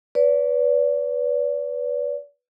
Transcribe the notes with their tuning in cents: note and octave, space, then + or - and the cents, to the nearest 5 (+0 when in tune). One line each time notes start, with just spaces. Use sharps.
B4 +0 D5 -35